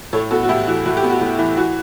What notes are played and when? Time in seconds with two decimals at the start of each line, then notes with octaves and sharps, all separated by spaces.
0.13 A2 A4 C#5
0.31 B3 F#4 A4
0.43 F#4
0.49 A2 E4 G4
0.67 E3 F#4
0.85 A2 F#4
0.97 G4
1.04 B3
1.10 F#4
1.21 A2
1.39 E3
1.57 E3 F#4